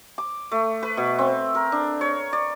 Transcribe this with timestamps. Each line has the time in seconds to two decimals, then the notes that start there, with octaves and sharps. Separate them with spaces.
0.18 D6
0.51 A3
0.83 B4
0.97 B2
1.19 C4
1.55 A#4
1.72 D4
2.01 C#5
2.33 D5